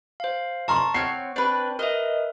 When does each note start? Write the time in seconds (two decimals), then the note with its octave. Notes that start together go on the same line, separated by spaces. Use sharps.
0.20 C5 F5
0.68 A5 A#5 C6 C#6 F6
0.94 C4 C#5 F#5 F6 C7
1.36 C4 D4 B4 C5
1.79 A#4 B4 D#5 E5